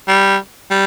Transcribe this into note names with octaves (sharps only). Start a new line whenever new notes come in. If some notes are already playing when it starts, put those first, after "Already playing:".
G3
G3